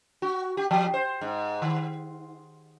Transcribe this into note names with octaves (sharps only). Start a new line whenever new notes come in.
F#4
G4
F3
C5
G#2
D#3